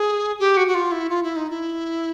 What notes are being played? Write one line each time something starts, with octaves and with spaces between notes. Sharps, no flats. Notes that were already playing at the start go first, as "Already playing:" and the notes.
Already playing: G#4
G4
F#4
F#4
F4
E4
F4
E4
D#4
E4